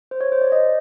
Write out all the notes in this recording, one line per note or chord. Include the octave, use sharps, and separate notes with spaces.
C5
C#5
C5
D5
D#5